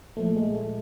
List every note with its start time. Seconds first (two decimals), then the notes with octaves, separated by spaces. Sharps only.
0.17 A#2 F3 A3
0.36 G#3
0.55 A3